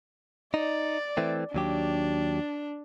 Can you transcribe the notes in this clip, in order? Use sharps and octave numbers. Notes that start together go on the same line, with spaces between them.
D#4 D5
E3 A3 C4
D#2 F#3 D4 G4